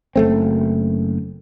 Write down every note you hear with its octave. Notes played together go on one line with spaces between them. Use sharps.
F#1 A3 C4